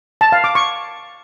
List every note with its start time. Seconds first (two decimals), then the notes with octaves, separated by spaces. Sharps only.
0.21 A5
0.32 F5
0.44 D6
0.55 C#6